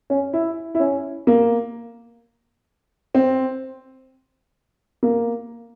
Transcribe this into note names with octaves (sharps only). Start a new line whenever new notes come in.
C#4
E4
E4
C#4
A#3
C4
A#3